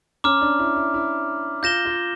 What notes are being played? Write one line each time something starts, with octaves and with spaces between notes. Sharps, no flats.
C#4 A#5 D6 F6
D4
E4
E4
E4
F4 G6 A#6 E7 G7
F4